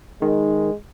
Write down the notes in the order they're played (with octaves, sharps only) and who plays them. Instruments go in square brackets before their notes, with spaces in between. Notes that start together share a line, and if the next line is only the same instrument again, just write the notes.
[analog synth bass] D#3 [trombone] G#3